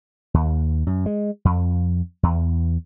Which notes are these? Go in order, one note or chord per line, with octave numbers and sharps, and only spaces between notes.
D#2
F#2
G#3
F2
E2